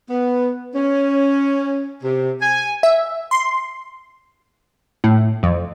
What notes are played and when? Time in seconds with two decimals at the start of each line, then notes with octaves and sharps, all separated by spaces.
0.10 B3
0.75 C#4
2.04 C3
2.42 G#5
2.83 E5
3.31 C6
5.04 A2
5.43 F2